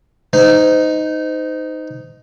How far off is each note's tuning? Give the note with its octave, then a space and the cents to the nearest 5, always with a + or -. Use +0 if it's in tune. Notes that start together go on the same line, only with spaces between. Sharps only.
D#4 +0 C5 -30